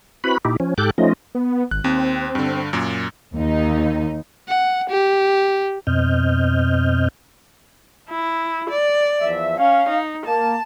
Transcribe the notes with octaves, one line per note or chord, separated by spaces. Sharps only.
C4 E4 F#4 B4 B5
A#2 D#4 E4 G4
F3 C#4
G#2 G4 A4 D6 F#6 G6
F3 A3 C#4 D#4 F4 D#5
B3
G#1 F#6
D#2 C4
G2 D3
F#2 A#2
D#2 D#4
F#5
G4
F2 B2 C4 D#5 F6 G6
E4
D5
E2 F3 E5
C#4 F5
D#4
A#3 A5